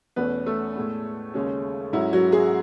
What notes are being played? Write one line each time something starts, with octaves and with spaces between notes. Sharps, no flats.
E2 B2 A3 B3 C#4 B4
A3 A4
A2 G#3 B3
D#2 C#3 G#3 C#4
G#2 F#3 C#4 E4
F#3 F#4
G#3 G#4